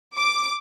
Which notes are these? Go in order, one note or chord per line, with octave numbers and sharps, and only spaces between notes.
D6